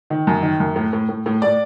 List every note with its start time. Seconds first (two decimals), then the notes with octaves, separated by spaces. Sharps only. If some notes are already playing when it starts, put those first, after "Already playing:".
0.10 D#3
0.27 F#2
0.43 D#3
0.60 F#2
0.76 A2
0.93 A2
1.09 A2
1.26 A2
1.42 A2 D5